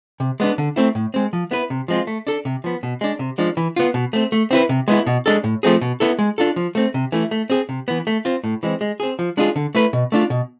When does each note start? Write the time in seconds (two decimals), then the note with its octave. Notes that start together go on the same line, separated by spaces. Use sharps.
0.20 C3
0.40 G#3 B3 D4
0.58 D3
0.76 A3 C4 E4
0.95 A2
1.14 G#3 C4
1.33 F3
1.51 B3 E4 B4
1.70 C3
1.88 F3 G#3 C4 F4
2.07 A3
2.27 D4 A4
2.45 C3
2.64 F3 B3
2.83 B2
3.01 G#3 D4
3.19 C3
3.38 F3 G#3 D4
3.57 E3
3.76 B3 F4
3.94 B2
4.13 A3 C4
4.32 A3
4.51 C4 E4 B4
4.69 C3
4.88 G#3 B3 E4
5.06 B2
5.26 G#3 D4 A4
5.44 A2
5.63 F3 A3 C4 G#4
5.81 B2
6.00 B3 E4 A4
6.19 G#3
6.38 D4 F4 A4
6.56 F3
6.75 A3 C4
6.94 C3
7.12 E3 A3 E4
7.31 A3
7.50 C4 G#4
7.69 C3
7.88 E3 B3
8.07 A3
8.25 C4 F4
8.44 A2
8.63 E3 G#3 C4
8.81 G#3
9.00 C4 G#4
9.19 F3
9.37 G#3 D4 F4 G#4
9.56 D3
9.75 A3 E4 B4
9.93 B2
10.12 A3 D4 F4
10.30 B2